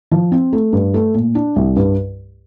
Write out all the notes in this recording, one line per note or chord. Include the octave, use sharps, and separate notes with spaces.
F3
C4
A3
G2
A3
A#2
D4
C2
G2